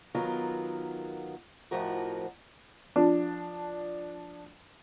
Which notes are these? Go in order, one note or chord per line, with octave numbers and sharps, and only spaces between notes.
D#3 F#3 B3 F4 A#4
F2 A2 F3 F#4 A#4
F3 D4